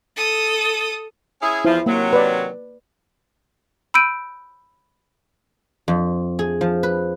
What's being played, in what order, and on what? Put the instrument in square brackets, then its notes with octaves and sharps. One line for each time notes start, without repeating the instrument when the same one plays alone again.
[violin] A4 D#6
[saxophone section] C#4 E4 G#4
[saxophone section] E2 F3 [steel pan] E4 C5
[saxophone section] C3 D#3 F#3 [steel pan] A#3
[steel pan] B4 D5
[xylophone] B5 E6 G6 D7 D#7
[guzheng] F2
G#4
F3
B4